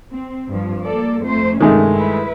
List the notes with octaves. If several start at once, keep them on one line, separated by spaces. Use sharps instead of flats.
C4
G2 F3
A#3 A4 D5
F2 A3 C5
G2 C3 D#3 G#3 A3 C#4
E4 B4